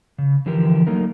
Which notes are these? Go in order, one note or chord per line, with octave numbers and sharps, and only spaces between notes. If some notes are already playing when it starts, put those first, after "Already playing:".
C#3
D3 E3 F3 G4 A#4
F#3 A3 A#3 D#4 A#4